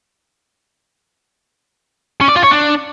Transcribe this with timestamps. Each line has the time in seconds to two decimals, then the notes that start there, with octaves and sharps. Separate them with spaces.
2.21 C#4
2.28 D5
2.36 F4
2.43 C#5
2.51 D4